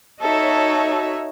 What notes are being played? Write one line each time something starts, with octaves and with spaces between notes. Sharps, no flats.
D#4 F#4 A4 C#5 E5